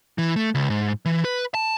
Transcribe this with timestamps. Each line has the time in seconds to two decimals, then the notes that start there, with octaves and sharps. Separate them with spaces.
0.18 E3
0.36 A3
0.55 C#2
0.70 G#2
1.05 E3
1.25 B4
1.54 A5